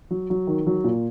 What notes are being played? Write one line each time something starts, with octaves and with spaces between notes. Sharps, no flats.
F#3
F#3
D#3
F#3
A#2